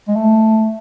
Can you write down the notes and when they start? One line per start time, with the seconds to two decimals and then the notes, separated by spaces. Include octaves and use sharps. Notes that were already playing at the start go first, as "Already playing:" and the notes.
0.08 G#3
0.16 A3